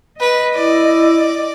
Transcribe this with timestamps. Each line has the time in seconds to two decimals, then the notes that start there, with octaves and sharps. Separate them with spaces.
0.20 B4 D#5
0.55 E4 D5